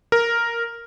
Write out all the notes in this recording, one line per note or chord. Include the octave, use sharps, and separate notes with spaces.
A#4